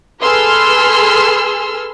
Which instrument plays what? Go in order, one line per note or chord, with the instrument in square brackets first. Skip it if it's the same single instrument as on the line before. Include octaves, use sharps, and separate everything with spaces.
[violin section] G#4 A4 B4 C6 E6 F6